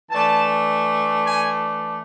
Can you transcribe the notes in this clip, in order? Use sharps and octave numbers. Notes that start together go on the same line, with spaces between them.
E3 A3 D4 A5
G#5